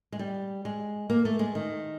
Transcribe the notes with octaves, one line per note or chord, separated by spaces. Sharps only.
G#3
G3
G#3
A#3
A3
G#3
D#3